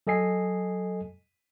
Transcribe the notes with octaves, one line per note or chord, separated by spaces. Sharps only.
F#3 A4 D#5 G#5 C7